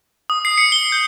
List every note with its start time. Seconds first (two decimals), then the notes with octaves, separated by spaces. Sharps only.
0.30 D#6
0.45 C7
0.58 C#7
0.72 G7
0.92 G6